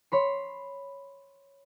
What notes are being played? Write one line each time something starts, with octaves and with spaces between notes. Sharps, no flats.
C#5 B5 C6